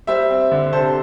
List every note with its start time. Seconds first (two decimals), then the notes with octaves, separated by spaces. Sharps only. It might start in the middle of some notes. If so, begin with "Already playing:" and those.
0.07 G3 C5 E5
0.30 C4
0.51 D3
0.73 C3 A4 C5